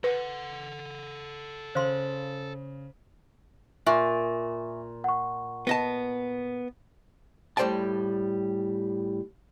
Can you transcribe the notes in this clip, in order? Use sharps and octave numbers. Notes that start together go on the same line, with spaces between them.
A4 B4 F#5
C#3 C5 F5 C6
A#2 E5 G#5 C#6
F#5 C#6
B3 D#5 A5
A2 G3 C5 D5 G5 A5